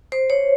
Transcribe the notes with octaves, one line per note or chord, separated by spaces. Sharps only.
C5
C#5